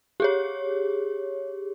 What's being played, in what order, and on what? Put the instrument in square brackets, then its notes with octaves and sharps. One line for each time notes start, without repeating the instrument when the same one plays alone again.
[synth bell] G4 G#4 C#5